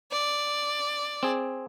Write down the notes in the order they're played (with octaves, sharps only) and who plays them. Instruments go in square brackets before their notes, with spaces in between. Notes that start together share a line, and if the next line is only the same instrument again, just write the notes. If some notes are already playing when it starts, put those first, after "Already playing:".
[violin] D5
[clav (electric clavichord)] C4 G#4